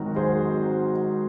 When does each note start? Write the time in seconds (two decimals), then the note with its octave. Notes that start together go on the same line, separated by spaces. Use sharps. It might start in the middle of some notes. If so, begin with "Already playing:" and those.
Already playing: G#1 G#2 D#3 F#3 F#4 A#4
0.16 G#4 C5